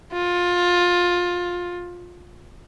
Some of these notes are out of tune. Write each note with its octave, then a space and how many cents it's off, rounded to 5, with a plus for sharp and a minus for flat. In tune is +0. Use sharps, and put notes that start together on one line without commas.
F4 +20